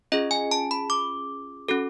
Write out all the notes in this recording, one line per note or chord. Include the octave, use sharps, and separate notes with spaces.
C#4 F4 G#4 D#5
G#5
A5
B5
D6
C#4 F#4 A4